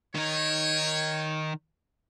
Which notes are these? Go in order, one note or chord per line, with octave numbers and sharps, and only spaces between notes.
D#3 D#4 C#5